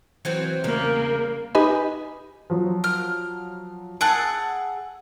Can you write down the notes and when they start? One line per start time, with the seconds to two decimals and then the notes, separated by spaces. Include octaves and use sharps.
0.25 E3 F#3 C4
0.64 E2 C#3 G3 A#3
1.55 D#4 G4 B4 D#5 G#5 B5
2.50 F3 F#3
2.84 F6
4.01 G#4 F#5 A5 E6